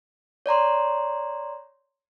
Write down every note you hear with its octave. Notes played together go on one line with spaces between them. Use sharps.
C#5 D5 A#5 C6